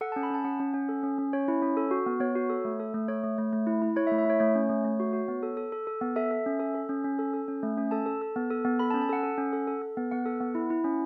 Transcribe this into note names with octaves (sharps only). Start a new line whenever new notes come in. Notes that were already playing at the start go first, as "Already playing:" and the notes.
A4 F#5
A5
C#4
B5
C#4 A5
C#4 F#5
C#4
C#4
A4
C#4
C#4
C#4 C#5
E4
C#4
A4
F#4
B3
B3 C#5
F#4
A4
A3
A4
A3
A3 C#5
A3
A3
A3
E4
E4
E4 C#5
E5
A3
E5
E4 C#5
A3 C#5
C#4
A3
A3
F#4
F#4
B3
A4
A4
A4
A4
B3
A4 E5
A4
C#4
A4
A4
C#4
C#4
A4
A4
C#4
A3
C#4
A4 A5
A4
A4
B3
A4
B3
A4 B5
A5
C#4
A5
A4 F#5
A4
C#4
A4
A4
A4
B3
B3 F#5
A4
B3
E4
E4
C#4